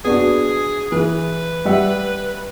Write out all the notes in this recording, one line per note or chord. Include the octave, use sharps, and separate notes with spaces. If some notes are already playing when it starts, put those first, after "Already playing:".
B3 D4 F#4 G#4
E3 G#4 B4
G3 E5 F#5